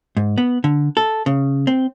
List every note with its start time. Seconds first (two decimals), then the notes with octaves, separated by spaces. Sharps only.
0.17 G#2
0.38 B3
0.64 D3
0.97 A4
1.26 C#3
1.67 C4